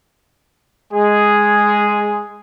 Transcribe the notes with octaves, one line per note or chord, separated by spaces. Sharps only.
G#3 G#4